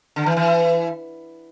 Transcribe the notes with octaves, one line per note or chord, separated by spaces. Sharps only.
D3
E3
E3